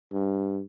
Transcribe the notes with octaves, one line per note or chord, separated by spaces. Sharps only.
G2